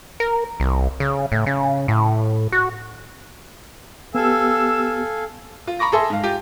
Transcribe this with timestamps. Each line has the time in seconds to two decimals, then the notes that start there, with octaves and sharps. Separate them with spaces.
0.20 A#4
0.60 C2
1.00 C#3
1.32 A2
1.46 C#3
1.88 A2
2.52 F#4
4.15 B3 G4 A4 F5 G#5 E6
5.67 F4
5.79 A#5 B5 C#6 D6 A#6
5.92 G#4 A4 E5 C6
6.10 G#2 F5
6.23 F4 G4